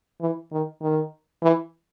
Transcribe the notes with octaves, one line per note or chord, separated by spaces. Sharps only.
E3
D#3
D#3
E3